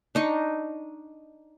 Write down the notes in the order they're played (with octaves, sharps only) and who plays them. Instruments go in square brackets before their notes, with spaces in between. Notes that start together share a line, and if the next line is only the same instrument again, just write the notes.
[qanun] D4 D#4 C#6